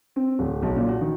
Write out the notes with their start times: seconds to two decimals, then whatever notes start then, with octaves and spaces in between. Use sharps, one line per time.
0.16 C4
0.39 D1
0.63 B1
0.76 A#2
0.89 F#4
1.01 D#3